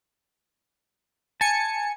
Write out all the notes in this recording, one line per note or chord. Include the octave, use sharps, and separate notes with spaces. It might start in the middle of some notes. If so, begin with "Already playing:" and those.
G#5 A5 C#7